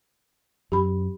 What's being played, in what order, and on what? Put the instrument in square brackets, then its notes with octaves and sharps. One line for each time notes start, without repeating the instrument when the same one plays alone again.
[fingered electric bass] F#2 [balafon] G4 B5